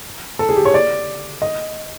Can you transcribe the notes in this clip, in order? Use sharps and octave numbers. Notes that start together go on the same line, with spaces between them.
A4
G#4
G4
C#5
D5
D#5